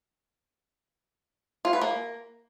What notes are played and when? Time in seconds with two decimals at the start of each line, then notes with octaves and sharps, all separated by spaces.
1.65 F4
1.73 B4
1.81 A#3